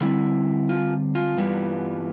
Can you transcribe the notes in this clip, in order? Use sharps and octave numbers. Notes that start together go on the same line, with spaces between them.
D3 G3 C4 E4
F4
F4
G2 E3 G3 B3